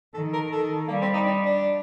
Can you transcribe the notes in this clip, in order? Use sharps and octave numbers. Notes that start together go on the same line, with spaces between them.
D#3 A4
A#4
D#3 A4
G3 A#3
C4
D#4
D4
D4